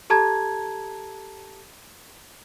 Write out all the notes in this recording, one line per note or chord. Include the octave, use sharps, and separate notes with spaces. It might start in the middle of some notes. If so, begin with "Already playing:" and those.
G4 A4 A5 A#5 G#6